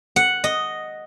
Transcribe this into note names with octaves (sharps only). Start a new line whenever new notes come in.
F#5
D#5